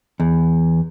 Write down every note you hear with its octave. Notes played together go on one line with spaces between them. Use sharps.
E2